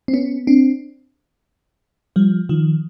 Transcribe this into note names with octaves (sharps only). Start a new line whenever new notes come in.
C4
B3 C#4
C4 D4
F3 G3
D#3 F3